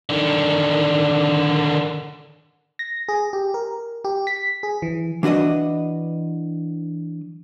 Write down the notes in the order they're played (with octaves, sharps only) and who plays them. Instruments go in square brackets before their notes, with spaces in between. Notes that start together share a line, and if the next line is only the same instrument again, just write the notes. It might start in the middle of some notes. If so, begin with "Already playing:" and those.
[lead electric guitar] D3 D#3
[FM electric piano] A#6
G#4
G4
A#4
G4
B6
G#4
E3
[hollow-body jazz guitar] E3 D4 F#4 B4 D#5